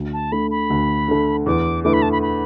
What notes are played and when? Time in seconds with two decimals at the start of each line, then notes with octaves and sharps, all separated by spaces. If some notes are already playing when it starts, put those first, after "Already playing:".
Already playing: D2
0.13 A5
0.32 D3 A3 B5
0.51 B5
0.70 D2
1.08 D3 A3
1.46 E2 D6
1.84 D3 A3 E4 B4 D6
1.93 B5
2.02 A5
2.12 B5
2.22 B5